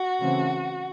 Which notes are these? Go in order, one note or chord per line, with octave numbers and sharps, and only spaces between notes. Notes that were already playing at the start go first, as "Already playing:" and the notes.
Already playing: F#4
C#3 E3 A3 C4